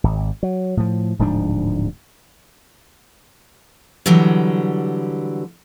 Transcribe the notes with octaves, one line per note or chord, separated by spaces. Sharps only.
G#1
F#3
A2 F3
D1 G#2 F3 D4
D3 E3 F#3 G3